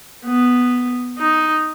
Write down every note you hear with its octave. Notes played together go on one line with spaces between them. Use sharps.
B3
D#4